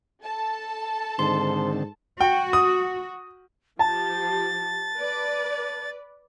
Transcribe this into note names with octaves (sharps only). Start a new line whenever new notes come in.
A4 A5
G#2 D3 D#3 C4 C6
F#4 G5
D#6
F3 G4 A5 A6
B4 D5